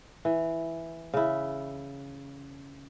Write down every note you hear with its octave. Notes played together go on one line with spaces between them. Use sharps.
E3
C#3 E4